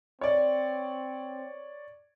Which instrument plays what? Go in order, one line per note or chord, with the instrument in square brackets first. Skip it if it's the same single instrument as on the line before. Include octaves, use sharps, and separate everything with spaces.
[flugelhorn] C4 [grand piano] C#5 D5